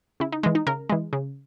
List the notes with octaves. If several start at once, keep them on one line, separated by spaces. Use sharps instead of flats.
C#3 E4
D#4
E3 G#3
D#4
C#3 A#4
E3 G#3
C#3